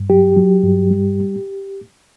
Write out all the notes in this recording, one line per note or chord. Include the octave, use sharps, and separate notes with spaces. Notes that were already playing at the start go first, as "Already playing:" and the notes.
Already playing: G2
F#3 G4
F#3
G2
G3